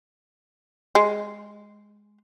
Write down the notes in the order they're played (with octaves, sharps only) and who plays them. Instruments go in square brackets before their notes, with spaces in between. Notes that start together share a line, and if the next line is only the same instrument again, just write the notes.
[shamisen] G#3